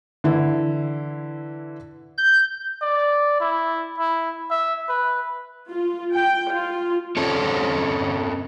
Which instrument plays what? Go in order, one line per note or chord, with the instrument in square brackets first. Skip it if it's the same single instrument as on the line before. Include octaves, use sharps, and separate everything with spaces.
[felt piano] D3 E3 E4
[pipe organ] G6
[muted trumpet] D5
E4
E4
E5
B4
[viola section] F4
G5
F4
[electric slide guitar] C4 C#4 A4 C#5